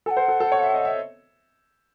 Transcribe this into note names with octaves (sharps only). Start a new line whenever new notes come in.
A4 F#5 G#5
C5
A4
A4
C#5
E5
D#5
E5